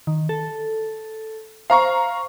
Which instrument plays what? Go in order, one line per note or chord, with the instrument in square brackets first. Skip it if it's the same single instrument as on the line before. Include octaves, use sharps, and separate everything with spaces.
[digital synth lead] D#3
A4
[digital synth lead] C5 [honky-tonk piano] F5 A#5 C#6